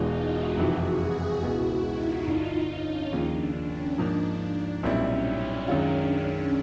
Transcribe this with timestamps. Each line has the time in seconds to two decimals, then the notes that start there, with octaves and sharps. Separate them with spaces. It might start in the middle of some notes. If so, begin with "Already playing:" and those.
Already playing: E1 E2 B2 G#3 D#4 F4
0.14 E4 F#4
0.56 F#1 F2 C3 E3 F#4 G#4
1.42 C#2 B2 G#3 B3 E4 F#4
1.84 D#4 F4
2.28 G1 G2 D3
2.71 C#4
3.12 D#2 C#3 F3 A#3 D4
3.56 C#4
3.97 G#2 F3 A#3 D4 D#4
4.41 D4
4.83 B1 A#2 G3 C4 C#4 E4
5.25 D4
5.68 F#2 D#3 G#3 C#4 F4